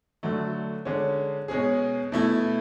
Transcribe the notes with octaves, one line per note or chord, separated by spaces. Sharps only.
D3 F#3 A3
D3 G#3 C#4
B2 G#3 C#4 G#4
B2 A3 E4